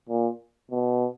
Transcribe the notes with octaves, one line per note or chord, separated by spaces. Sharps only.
A#2
B2